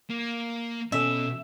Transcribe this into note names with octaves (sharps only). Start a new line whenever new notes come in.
A#3
B2 C#4 A4 E5